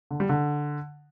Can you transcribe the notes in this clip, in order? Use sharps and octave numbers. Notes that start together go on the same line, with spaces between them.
D3
G3
D3